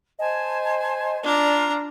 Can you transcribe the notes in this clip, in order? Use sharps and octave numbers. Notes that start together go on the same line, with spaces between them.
C5 D#5 G#5 A5
D4 F4 D5 A#5